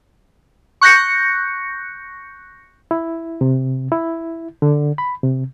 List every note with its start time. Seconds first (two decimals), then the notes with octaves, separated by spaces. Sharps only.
0.81 C#6 F#6 G6 A#6 C#7
2.91 E4
3.41 C3
3.92 E4
4.62 D3
4.98 B5
5.23 C3